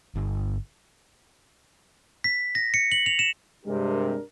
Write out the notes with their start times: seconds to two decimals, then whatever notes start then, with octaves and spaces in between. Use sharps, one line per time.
0.15 G1
2.24 B6
2.55 A#6
2.74 C#7
2.92 F#7
3.06 F7
3.19 E7
3.66 G2 C3 G#3 D4 G4 A#4